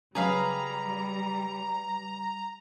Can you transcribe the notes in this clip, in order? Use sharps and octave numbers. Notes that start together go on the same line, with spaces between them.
C#3 F#3 G3 G#4 B4 F5 A#5